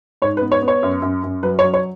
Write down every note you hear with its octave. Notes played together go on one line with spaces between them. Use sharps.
G#2 C#5
B4
B3
C#5
B3
C#5
F#2
F#2
F#2
F#3 B4
C#5
F#3
C#5